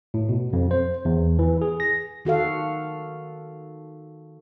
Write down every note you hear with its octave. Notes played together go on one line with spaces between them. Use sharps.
A2
B2
F2
C5
E2
E3
G#4
A#6
D#3 F#4 A4 F5